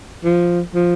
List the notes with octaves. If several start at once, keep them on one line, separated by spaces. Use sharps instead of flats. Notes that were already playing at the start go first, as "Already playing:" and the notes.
F3
F3